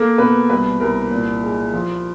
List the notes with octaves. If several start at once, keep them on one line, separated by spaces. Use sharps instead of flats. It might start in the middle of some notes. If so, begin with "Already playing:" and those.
Already playing: A#3 A4
B2 B4
C2 B4
C2 A#4
A#2
G#3
F3